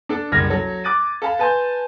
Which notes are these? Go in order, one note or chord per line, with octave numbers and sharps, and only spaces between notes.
D4 A4
F#1 C2 F6 G#6 A#6
F#3 A4
D6 F#6 A6 D#7
A4 F5 A5 B5
B4 G#5 A5 C6 G6